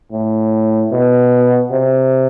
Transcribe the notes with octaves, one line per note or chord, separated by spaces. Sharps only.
A2
B2
C3